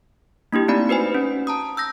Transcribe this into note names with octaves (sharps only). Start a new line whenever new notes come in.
A#3 D4 E4 G4
A3 C4 D#4 D5 B5
F#4 B4 C5 G#5
C#4
A5 A#5 D#6
E6 G6 A#6